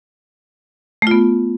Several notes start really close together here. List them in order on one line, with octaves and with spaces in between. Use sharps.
A3 F4 B3